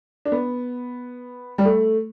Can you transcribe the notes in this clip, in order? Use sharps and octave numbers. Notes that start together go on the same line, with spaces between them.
D4
B3
G3
A3